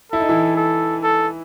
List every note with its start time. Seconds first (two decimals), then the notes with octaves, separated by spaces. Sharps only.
0.12 E4 A4
0.20 D#4
0.29 E3 E4
0.57 A4
1.03 A4